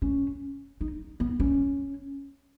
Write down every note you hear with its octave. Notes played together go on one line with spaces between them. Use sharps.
C#4
D#4
B3
C#4